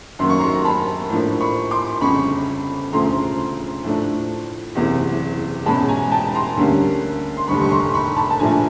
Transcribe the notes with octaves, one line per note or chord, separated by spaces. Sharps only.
F#2 D#3 F#3 A#3 C6
C#6
A#5 C6
A#5
A5 B5
A2 F3 A#3 D4
B5 C#6
C6 D6
G1 F2 C#3 B5 C#6
E1 D2 C#3 F3 A3 A#5 C6
A2 F3 A3 D4
F#1 E2 C3 E3
E2 B2 G#3 C#4 A5 B5
G#5 A#5
G5 A5
A#5 C6
D2 D3 G3 A#3 C#4
C6
F1 D#2 D3 G3 B5 C#6
C#6
A#5 C6
B5 C#6
A5 B5
A5
A#1 A#2 F3 A3 D4 G#5 A#5